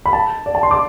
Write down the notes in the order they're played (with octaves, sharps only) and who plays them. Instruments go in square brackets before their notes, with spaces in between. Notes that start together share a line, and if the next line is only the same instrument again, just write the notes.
[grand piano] B5
A5
D5
A5
C6
D6